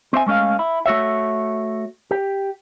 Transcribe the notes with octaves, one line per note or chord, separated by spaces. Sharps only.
C4 C5 E5 G#5
G#3 A3 C#4 D#5 F5
E4
A3 F#4 C#5 E5
G4